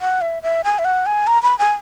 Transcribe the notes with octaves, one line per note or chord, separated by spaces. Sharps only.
F#5
E5
E5
G#5
E5
F#5
G#5
A#5
B5
G#5